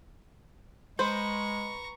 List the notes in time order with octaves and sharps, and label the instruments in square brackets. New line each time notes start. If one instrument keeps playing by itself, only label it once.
[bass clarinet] G#3 [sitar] B4 [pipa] C5 [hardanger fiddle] A#5 C#6